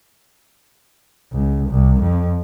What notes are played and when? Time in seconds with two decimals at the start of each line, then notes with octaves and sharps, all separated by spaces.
1.32 C#2
1.69 C2
2.01 F2